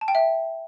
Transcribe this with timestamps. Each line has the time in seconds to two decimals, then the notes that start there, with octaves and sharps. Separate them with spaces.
0.01 A5
0.08 G5
0.15 E5